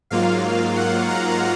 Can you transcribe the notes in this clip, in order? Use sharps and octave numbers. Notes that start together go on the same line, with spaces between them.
G#2 F#3 A#3 F4 F5
F#5
A#5